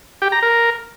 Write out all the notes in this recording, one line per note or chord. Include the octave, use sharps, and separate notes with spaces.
G4
A#5
A#4